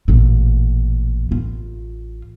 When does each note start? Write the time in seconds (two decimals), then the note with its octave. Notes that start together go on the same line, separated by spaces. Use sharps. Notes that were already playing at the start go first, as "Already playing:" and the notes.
0.08 A1 A#2
1.31 A1 F4